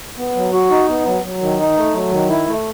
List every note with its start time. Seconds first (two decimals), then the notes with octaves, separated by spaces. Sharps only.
0.17 B3
0.35 F#3
0.53 F#4
0.70 D#4
0.88 B3
1.06 F#3
1.23 F#3
1.41 D#3
1.59 D#4
1.77 A3
1.94 F#3
2.11 D#3
2.29 E4
2.47 A3